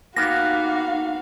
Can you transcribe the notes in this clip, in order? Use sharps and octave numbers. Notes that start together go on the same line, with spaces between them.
A#3 B3 D#4 F#4 G4 F5 A#6